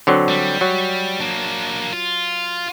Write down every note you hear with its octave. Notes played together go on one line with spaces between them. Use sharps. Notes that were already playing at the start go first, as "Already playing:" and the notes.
D3 F#3 C4
G3
F#3
A#3 D4
F4